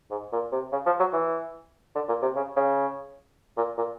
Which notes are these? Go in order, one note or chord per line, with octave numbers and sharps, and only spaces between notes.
G#2
A#2
C3
C#3
F3
F#3
E3
D3
A#2
C3
C#3
C#3
A#2
A#2